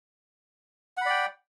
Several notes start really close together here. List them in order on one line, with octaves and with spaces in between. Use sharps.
F#5 B5 D5 G5